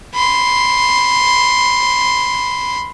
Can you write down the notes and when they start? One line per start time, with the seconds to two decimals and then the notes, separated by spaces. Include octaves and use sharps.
0.14 B5 C6